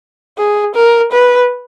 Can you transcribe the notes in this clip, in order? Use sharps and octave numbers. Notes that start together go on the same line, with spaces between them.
G#4
A#4
B4